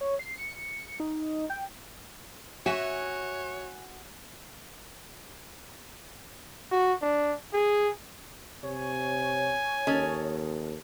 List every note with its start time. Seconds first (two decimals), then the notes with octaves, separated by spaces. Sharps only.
0.01 C#5
0.19 C7
0.37 C#7
1.00 D#4
1.50 G5
2.66 F#4 C#5 E5 G#5
6.72 F#4
7.02 D4
7.53 G#4
8.63 C3 C#5 G#5
9.87 D#2 C#4 A4 D#5